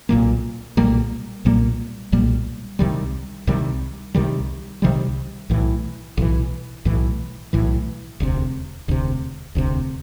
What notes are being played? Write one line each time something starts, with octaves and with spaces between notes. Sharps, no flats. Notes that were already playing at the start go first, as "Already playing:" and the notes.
B1 A#2 G3 A#3
B1 A#2 G3 A#3
B1 A#2 G3 A#3
B1 A#2 G3 A#3
C2 C3 D#3 G3
C2 C3 D#3 G3
C2 C3 D#3 G3
C2 C3 D#3 G3
B1 A2 E3
B1 A2 E3
B1 A2 E3
B1 A2 E3
E1 D2 C3
E1 D2 C3
E1 D2 C3